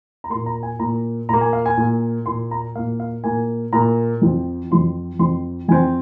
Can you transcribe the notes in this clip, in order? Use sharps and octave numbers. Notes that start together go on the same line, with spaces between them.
A#5
A#3 C6
A#2
A#5
G#5
A#2 A#3 A#5
A#2 A#3 A#5
G#5
F5
G#5
A#2 A#3
A#2 A#3 C6
A#5
A#2 A#3 F5
F5
A#2 A#3 G#5
A#2 A#3 A#5
F2 F3 C4
F2 F3 C4 C6
F2 F3 C4 C6
F2 F3 C4 G#5